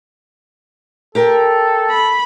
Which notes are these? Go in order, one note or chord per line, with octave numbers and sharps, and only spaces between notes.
G4 A4 A#4 G5
B5